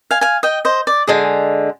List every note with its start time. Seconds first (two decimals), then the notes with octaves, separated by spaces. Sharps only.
0.11 F5 G#5
0.21 F5 G#5
0.43 D#5 G5
0.65 C5 D#5
0.87 D5
1.07 D3 G#3 G#4